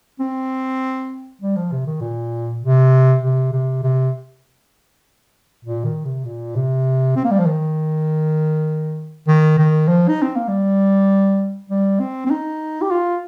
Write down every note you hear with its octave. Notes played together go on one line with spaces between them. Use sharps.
C4
G3
F3
C3
D#3
A#2
C3
C3
C3
C3
A#2
D#3
C3
A#2
C3
C4
A#3
G3
F3
D#3
D#3
D#3
F3
D#4
C4
A#3
G3
G3
C4
C4
D#4
G4
F4